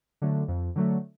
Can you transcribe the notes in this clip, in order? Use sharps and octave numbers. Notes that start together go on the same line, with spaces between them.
D3 F#3 A3
F2
D3 F#3 A3